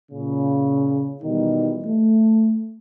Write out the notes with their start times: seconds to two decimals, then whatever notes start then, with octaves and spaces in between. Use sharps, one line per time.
0.12 A#2 C#3
1.23 B2 D#3 E3 G3 D#4
1.84 A3